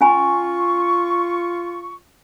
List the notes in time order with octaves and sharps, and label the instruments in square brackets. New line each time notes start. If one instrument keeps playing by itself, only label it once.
[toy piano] C#4 G#5 B5 [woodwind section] F4 C#6